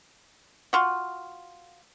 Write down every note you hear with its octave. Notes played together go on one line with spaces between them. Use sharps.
F4 F#4